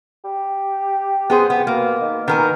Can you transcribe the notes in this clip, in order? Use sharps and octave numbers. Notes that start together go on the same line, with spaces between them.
G4
B3 G#4 C5
B3
B2 A#3
D#3
D#3 B3 A#4 G#5